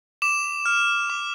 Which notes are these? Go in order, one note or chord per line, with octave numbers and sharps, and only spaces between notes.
D6 E7
F6
D6